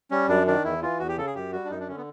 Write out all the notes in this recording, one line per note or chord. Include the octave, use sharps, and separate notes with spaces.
G3 C#4
F#2 D4
D#3 D4
E2 E4
E3 F4
E2 F#4
G4
C#3 A4
G#4
F#2 G4
G3 F#4
D4
F#2 D#4
D4
D3 C#4
B3